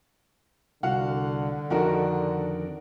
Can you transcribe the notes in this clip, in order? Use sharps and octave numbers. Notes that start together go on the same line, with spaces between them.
C2 D3 F#4 F5 F#5
F2 D#3 D4 F#4 A#4